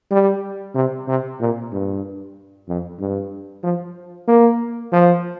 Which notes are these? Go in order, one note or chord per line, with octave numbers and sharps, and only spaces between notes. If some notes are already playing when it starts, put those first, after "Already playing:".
G3
C3
C3
A#2
G2
F2
G2
F3
A#3
F3